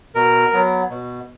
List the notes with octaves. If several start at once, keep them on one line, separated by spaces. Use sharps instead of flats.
B2 A#4
F#3 B3
B2